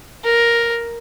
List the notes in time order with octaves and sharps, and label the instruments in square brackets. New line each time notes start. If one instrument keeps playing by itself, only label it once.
[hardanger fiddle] A#4